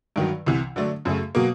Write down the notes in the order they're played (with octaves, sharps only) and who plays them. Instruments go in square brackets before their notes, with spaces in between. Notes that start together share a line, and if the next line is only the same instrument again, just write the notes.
[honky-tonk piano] G2 D#3 F#3
C2 C3 E3
D3 F#3 A3 D4
F#2 C#3 F#3 A3
B2 F#3 A#3